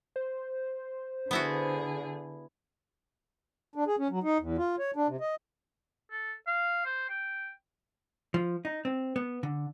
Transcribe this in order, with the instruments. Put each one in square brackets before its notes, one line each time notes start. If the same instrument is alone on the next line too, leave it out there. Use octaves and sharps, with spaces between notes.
[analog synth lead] C5
[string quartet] D3 G#4 [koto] B3 E4 F#4
[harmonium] D4
G#4
C#4
F#3
D#4
E2
F4
C#5
D4
C3
D#5
[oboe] A4
F5
C5
G5
[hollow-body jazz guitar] F3
D#4
C4
B3
D3